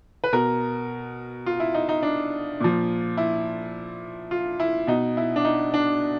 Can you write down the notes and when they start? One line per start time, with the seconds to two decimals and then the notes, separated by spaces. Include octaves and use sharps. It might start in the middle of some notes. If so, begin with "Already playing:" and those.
0.24 B4
0.33 B2 A#4
1.46 F4
1.60 E4
1.75 D#4
1.89 D#4
2.03 D4
2.60 A#2 F3
3.17 E4
4.31 F4
4.60 E4
4.87 B2 D#4
5.17 E4
5.36 D4
5.45 D#4
5.74 D4